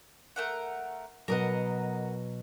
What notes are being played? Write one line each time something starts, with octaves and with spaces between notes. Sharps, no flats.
A3 A#4 F#5
B2 F#3 A#4 D#5 F#5